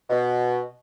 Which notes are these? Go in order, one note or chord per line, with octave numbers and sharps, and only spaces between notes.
B2